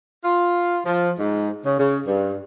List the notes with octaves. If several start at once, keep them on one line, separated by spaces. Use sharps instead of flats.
F4
F3
G#2
C#3
C#3
G2